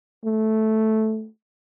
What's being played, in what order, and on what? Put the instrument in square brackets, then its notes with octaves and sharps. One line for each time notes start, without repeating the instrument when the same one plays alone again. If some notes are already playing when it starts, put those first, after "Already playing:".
[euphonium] A3